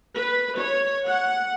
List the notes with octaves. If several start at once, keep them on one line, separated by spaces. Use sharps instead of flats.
B4
C#5
F#5